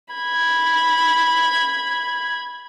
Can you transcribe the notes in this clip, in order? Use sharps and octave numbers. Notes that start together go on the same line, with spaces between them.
B5 G#6